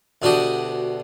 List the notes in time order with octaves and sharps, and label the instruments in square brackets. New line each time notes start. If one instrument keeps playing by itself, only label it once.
[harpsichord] D2 B2 D4 F#4 G4 D#6